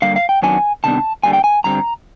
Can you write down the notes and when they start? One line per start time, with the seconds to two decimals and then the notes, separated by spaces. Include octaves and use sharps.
0.02 D3 G3 A#3 F5
0.16 F5
0.29 G5
0.42 F#2 D#3 F#3 B3 D4 G#5
0.84 C3 D#3 G3 B3 D4 A5
1.23 D3 G3 A#3 G#5
1.33 G5
1.44 G#5
1.64 G2 D3 G3 C4 A#5